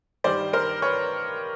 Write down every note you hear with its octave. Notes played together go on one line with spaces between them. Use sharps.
G2 D#3 G3 C5 D5
A#4 C5
B4 C#5